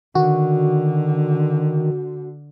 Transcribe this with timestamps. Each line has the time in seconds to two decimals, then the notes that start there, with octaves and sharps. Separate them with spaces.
0.15 D3 D#3 F#4